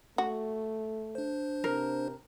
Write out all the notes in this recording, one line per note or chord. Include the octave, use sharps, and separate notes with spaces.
A3 F#4
D4 C5
C3 A#4